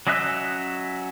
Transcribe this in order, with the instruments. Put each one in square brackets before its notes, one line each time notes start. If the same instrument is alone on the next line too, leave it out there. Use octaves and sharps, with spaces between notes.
[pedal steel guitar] F#3 C#4 D#5 E5 F#6